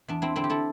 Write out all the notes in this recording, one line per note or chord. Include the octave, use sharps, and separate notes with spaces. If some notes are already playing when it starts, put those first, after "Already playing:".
E2 D4
C4 E4
D3 C4 E4
G4
E4 A4